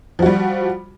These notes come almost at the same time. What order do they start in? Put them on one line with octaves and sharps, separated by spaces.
F3 F#4 G3